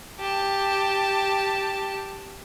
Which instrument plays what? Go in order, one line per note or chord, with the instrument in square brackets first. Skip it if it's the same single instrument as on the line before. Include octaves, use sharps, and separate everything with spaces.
[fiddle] G4 A5